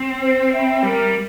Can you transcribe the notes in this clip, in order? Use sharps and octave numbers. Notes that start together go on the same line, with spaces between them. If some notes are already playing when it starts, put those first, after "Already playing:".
Already playing: C4
C5
E5 G5 B5
G3 A#4